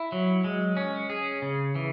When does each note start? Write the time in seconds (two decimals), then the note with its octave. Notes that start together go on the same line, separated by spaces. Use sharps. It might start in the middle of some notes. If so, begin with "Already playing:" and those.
Already playing: E4
0.12 F#3
0.44 G#3
0.77 C#4
1.10 G#4
1.42 C#3
1.75 E3